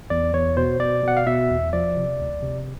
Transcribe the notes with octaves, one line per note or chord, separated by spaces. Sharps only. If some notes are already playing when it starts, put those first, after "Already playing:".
E2 D5
E2 C#5
B2 C5
B2 D5
B2 F#5
F5
B2 E5
E2
F3 D5
C3
D2
C3